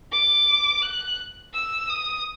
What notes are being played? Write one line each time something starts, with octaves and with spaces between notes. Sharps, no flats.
D6
F#6
E6
D#6